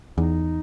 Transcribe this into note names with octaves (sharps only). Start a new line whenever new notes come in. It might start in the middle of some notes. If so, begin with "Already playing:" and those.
E2 D#4